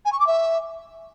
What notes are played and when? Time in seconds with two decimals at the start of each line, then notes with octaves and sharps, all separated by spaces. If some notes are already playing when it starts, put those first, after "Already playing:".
0.05 G#5
0.13 C#6
0.20 D6
0.27 E5